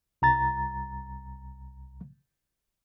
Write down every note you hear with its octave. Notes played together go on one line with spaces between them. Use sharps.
C2 A#5 A6